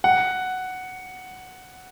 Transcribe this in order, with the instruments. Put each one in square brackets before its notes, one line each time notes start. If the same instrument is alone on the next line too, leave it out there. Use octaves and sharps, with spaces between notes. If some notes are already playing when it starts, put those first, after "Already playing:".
[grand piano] F#5